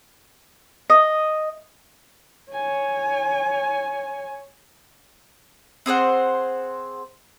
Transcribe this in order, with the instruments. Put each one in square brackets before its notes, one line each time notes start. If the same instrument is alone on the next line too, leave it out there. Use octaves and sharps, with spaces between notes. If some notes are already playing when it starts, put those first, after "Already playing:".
[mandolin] D#5
[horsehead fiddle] C#5 G#5
[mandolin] C4 G#4 C5 F#5